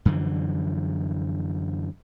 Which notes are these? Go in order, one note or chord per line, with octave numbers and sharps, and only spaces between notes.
F#2 D3 E3 F3